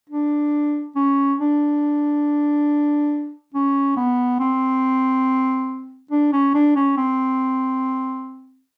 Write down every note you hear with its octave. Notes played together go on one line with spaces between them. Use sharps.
D4
C#4
D4
C#4
B3
C4
D4
C#4
D4
C#4
C4